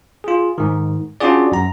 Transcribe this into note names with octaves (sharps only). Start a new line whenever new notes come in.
F4 G#4
G#2 D#3
C#4 D4 F4 F#4 G#4 D5
F#2 A#5